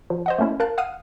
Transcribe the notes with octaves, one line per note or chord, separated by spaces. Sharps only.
F3
C5 D#5 F#5
A3 A#3 C#4 E4
A#4 F5 A5 F#6
F5 F#5 D#6 F6 D#7